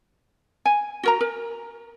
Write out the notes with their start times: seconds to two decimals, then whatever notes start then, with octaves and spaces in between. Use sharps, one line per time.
0.66 G#5
1.03 F#4 A#4 A#5
1.21 A#4